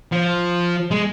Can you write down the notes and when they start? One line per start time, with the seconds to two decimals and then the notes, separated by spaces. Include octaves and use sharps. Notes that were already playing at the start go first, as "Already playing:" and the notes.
0.12 F3
0.91 G#3